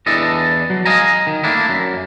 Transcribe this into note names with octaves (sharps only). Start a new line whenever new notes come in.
E2 E3 D4 A4 D#5
F#3
D#5 F5 G#5 A#5
D#3
A3 A#3 D4 E4
F#2